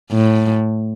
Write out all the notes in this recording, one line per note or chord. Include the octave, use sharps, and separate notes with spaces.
A2